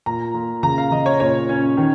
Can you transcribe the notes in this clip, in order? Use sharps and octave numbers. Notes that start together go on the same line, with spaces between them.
A#2 A#5
A#2
C#3 A#5
F5
C#3 D#5
C#5
A#2 C#5
C#4
D#3